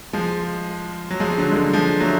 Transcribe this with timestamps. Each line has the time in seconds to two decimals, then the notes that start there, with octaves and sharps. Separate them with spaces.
0.13 F3 G#3
1.10 F#3
1.20 F3 G#3
1.31 G#3
1.38 D3 F#3
1.51 G#3
1.56 D3 F#3
1.73 F3 G#3
2.00 F#3 A3